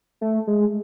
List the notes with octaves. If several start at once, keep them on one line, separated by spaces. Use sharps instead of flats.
A3
G#3